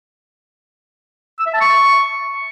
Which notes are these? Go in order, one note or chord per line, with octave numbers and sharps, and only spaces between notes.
E6
E5
A5
C#6